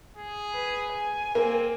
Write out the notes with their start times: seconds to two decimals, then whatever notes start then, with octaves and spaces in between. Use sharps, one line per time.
0.17 G#4
0.53 B4
0.93 G#5
1.35 A#3 C4